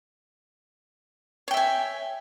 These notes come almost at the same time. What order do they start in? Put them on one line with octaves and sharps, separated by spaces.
C#5 G5 E5 G#5